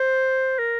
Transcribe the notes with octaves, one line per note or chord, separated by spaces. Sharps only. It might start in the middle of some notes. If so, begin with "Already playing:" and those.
Already playing: C5
A#4